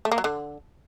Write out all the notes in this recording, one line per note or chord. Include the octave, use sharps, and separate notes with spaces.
A3
A#3
F#3
D3